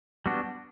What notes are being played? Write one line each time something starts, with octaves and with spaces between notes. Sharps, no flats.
G3 B3 D4 F#4